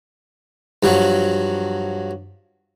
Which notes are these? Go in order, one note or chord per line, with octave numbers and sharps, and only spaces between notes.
G2 F3 F#3